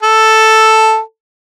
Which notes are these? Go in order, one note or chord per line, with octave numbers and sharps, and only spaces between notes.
A4